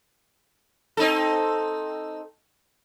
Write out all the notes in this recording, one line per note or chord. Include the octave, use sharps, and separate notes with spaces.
C4 D#4 A4